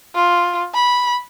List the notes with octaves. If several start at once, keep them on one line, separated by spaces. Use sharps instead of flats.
F4
B5